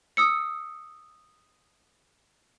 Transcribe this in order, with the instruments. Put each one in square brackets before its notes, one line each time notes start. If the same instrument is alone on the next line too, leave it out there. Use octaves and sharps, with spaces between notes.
[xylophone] D#6 E6 C#7